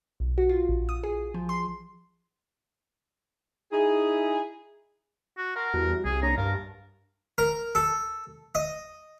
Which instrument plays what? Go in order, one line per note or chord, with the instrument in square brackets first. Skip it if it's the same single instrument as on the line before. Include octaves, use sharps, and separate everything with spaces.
[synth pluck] B1
F#4
F4
A#1
D#6
G#4
F3
C6
[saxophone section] D#4 E4 G#4
[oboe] F#4
[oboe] A#4 [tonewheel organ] F#5 A5 C6
[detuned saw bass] E2 [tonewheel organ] G3 F#4
[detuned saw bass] C2 [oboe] G#4
[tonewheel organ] A#3 D4 C#5 [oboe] A#5
[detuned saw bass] G2 [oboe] A#4 [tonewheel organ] F5 A5
[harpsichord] A#4
A4
D#5